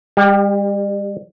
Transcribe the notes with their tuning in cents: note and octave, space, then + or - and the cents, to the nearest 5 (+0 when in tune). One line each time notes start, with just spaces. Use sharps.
G3 +40 G4 +10